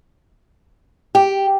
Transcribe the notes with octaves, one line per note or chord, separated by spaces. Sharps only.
G4